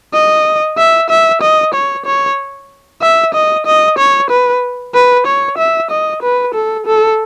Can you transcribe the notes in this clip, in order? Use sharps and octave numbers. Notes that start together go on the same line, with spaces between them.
D#5
E5
E5
D#5
C#5
C#5
E5
D#5
D#5
C#5
B4
B4
C#5
E5
D#5
B4
A4
A4